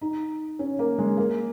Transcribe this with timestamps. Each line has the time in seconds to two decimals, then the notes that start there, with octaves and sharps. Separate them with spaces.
0.01 D#4
0.59 C#4
0.79 A#3
0.98 G#3
1.17 A#3